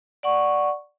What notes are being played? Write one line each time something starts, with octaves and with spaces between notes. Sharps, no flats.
D5 F#5 C#6